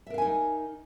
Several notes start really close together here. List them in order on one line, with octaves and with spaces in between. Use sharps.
E5 A#4 F5 G#5 D#4